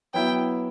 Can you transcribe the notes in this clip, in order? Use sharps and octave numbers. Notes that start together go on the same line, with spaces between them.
F#3 B3 E4 G5